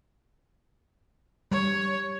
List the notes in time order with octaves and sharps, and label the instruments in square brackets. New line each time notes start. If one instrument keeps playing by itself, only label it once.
[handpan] G3 [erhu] C#5